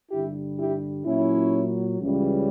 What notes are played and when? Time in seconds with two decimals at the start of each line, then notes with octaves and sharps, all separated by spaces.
0.11 G2 D3 G3 E4 G4
0.58 E4 G4
1.06 A#2 F#3 C#4 E4
2.00 C#2 C#3 E3 G3